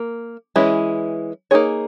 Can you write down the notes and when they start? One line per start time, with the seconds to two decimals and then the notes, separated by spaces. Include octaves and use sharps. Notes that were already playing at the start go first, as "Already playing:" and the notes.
Already playing: A#3
0.56 E3 G#3 C#4 E4
1.51 A#3 D#4 G#4 C#5